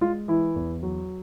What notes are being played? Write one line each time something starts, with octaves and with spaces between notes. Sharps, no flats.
G#3 F4
E3 E4
E2
F#3